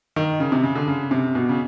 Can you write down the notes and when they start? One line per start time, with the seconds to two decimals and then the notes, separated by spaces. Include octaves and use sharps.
0.16 D#3
0.40 C#3
0.52 C3
0.64 C#3
0.75 D3
0.88 C#3
1.11 C3
1.35 B2
1.49 C#3